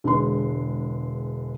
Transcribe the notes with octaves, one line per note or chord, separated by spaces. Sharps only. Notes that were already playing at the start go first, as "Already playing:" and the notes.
E1 D3 G#3 B4 C6